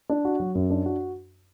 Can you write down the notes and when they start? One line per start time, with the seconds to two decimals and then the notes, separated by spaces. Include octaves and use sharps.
0.09 D4
0.25 F#4
0.40 F#3
0.55 F#2
0.70 D4
0.86 F#4